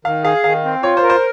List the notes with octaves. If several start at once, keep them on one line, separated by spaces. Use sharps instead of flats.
D#3 F5
G#4 F5
D#3 F5
C4
F4 C#5
C5
A#4
C5